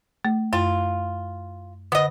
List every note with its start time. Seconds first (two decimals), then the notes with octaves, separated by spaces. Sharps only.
0.25 A3
0.53 F#2 F4
1.92 D3 B3 D#5